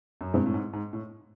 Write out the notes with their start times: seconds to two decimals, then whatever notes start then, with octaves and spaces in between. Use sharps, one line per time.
0.21 F#2
0.34 G2 B2 G#3 C4 E4
0.46 A2
0.54 G#2
0.73 G#2
0.93 A2